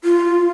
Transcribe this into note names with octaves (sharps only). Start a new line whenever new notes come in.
F4